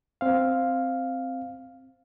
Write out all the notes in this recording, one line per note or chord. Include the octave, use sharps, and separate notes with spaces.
C4 F5